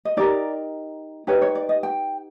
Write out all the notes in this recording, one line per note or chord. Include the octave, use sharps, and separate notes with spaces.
D#5
D#4 G4 A#4 D5
D#4 G4 B4 C#5
C#5
D5
D#5
G5